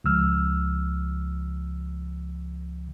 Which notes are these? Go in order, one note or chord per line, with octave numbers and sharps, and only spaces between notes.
C#2 F3 E6 F6